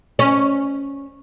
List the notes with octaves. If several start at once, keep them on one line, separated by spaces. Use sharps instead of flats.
C#4